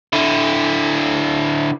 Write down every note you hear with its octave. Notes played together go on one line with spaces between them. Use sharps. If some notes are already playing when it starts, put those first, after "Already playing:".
D3 E4